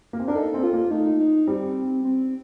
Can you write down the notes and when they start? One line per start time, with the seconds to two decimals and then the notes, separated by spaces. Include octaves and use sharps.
0.13 A#3
0.20 C4
0.28 D4 A#4
0.35 D#4 A4
0.54 C4
0.63 F4
0.73 A#3
0.91 A3 D#4
1.20 D#4
1.47 G3 C4
2.04 C4